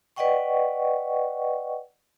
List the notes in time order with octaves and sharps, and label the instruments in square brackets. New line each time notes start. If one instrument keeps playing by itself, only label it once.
[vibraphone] B4 D5 D#5 F#5 G5 C#6